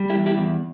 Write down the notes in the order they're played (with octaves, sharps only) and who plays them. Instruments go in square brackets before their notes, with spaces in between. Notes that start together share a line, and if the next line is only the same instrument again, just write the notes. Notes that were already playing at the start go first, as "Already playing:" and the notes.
Already playing: [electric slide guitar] G3
E4 G4
E2
E4 G4
E2